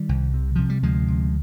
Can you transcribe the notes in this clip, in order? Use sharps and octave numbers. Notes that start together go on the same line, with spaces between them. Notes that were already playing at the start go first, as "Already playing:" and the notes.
Already playing: D#3 G3
C2
C3
C3 F3
G3
D2 F3 G#3
C3